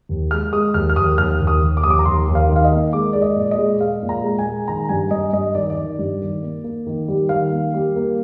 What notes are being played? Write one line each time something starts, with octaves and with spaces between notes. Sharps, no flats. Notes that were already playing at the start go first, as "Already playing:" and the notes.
D#2
G#3 F6
G#3 D#6
D#2 F6
F6
D#2 D#6
D#2 F6
D#2
D#6
D#2
D6
D#2 D#6
D6
A#5
D#2 C6
D#2
F5
D#3
F5
D#5
A#3
G#3 D6
G#3 D5
D#5
A#2 D5
D#5
G#3
G#3 F5
A#2
A#5
G#3
G#5
G#3
D#3 A#5
G2 G#5
G2 D#5
G2 D#5
D#3 D5
D5
D#3
G2
D#3
A#3
A#3
D#3
G3
D#3 F5
A#3
G3
A#3